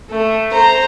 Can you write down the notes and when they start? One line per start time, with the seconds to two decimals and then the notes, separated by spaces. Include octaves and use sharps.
0.10 A3
0.53 C5 A#5